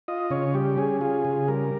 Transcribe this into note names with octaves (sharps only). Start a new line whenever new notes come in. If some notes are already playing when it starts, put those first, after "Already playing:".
F4 D#5
C#3 C#5
G3 G4
C#4 G#4
F4 G#4
C#3
G3 A#4